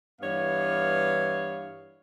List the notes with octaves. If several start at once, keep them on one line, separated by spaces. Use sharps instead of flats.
G2 E3 B3 C#5 F5